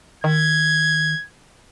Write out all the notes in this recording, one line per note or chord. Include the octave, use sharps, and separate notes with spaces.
D#3 G#6